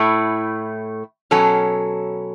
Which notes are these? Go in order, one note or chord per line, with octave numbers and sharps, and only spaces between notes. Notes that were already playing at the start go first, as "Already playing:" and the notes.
Already playing: A2 A3 E4
B2 F#3 C#4 A4